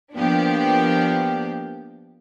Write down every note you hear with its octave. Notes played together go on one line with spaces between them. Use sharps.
F3 A#3 B3 D4 G4